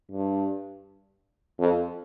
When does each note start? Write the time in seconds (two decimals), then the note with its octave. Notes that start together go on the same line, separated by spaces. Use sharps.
0.11 G2
1.59 F2